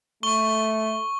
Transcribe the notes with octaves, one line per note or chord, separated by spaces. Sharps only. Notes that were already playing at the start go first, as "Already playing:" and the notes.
A3 C#6 G7